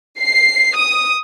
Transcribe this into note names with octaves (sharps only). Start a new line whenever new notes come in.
C7
D#6